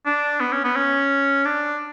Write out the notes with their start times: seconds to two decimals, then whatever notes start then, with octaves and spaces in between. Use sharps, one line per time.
0.06 D4
0.40 B3
0.52 C#4
0.64 B3
0.76 C#4
1.45 D4